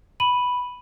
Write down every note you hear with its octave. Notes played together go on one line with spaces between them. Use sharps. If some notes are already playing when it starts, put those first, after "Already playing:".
B5 D#7 F#7